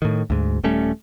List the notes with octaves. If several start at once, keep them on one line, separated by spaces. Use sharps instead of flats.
A2 D#3
D2 G#2
D#1 G3 A3 C#4